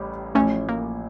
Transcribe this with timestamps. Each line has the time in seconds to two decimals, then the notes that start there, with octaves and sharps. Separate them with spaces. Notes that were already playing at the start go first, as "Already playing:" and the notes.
Already playing: A1 A2 G3
0.35 A1 A2 F3 A3 C#4
0.69 A#3